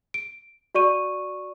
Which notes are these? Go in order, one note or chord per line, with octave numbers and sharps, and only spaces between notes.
D7
F#4 D5 C#6 D#7